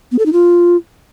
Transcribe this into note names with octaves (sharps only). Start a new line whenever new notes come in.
B3
A4
D#4
F4